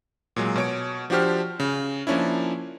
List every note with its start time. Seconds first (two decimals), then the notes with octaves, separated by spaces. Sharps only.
0.36 A#2 F#3 G#3
0.56 B2 C#5 D7
1.10 F3 D4 F#4 G4 C5 F6
1.60 C#3
2.07 F3 A#3 C#4 D4 E4